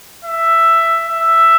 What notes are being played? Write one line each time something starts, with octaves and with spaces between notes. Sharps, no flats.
E5
E5